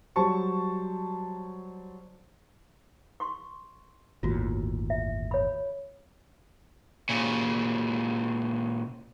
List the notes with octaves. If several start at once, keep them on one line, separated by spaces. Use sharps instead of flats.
F#3 G3 C5 A5 C#6
C6 C#6
G1 D#2 A2 F4 F#4
E5
C#5 B5
A#2 C#3